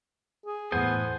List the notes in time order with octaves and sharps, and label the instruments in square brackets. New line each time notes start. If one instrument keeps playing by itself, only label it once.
[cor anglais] G#4
[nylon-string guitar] E2 A2 [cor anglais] B3 [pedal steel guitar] A4 C5 G#5